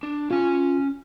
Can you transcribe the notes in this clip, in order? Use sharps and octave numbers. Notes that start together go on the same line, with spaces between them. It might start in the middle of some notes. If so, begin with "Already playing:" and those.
D4
C#4 F4 G#5